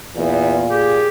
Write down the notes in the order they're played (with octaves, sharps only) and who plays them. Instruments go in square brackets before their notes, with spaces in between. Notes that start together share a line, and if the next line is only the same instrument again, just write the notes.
[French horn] E2 [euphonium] A#2
[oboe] G4 [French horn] G#4